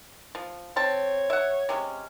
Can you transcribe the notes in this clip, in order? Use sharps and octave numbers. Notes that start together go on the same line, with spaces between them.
F3
C4 C#5 A5
E5 F#5
C3 G#3 C#4